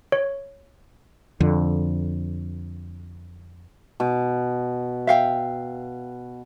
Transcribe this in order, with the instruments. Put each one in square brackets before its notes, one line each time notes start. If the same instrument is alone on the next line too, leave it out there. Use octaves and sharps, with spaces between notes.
[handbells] C#5
[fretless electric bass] F2 D3
[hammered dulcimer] B2
[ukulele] E5 F5 G5